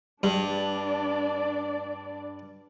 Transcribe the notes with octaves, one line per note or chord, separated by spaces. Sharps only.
G2 D4 D5